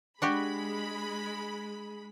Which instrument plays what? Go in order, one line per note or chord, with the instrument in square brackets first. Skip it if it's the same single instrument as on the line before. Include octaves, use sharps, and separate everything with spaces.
[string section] G#3 B5 [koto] D4 F#4 G4